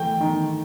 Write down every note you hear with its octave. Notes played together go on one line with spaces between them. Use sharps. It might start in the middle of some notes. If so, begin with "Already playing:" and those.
Already playing: E3 A3 G5
D#3